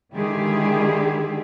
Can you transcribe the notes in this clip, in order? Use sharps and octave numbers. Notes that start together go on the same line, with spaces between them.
D3 D#3 G#3 E4 G4 G#4